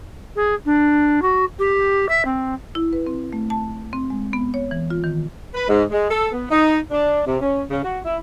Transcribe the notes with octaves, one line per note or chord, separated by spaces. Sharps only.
G#4
D4
F#4
G4
E5
C4
E4
B4
C4
A3
A5
C4
G#3
B3
C#5
E3
F4
D#3
B4
G#2
G#3
A4
B3
D#4
D4
C3
C#4
C#3
F#4
E4